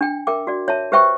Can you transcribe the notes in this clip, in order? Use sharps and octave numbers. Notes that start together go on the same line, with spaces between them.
D4 G5
A#4 E5 G5 D6
F#4 D5
C#5 E5 A5
G4 B4 C5 E5 G5 C#6